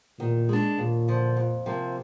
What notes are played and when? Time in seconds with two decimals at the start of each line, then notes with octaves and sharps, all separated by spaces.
0.20 A#2 D#3
0.49 G#3 D4
0.78 D#2 A#2
1.08 D3 F3
1.37 F2
1.66 C3 F3 A#3